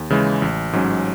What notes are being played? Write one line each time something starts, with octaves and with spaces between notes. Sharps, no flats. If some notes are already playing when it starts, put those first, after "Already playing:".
Already playing: D#2
C#3 E3 G#3
A1
G#2 F#3 C#4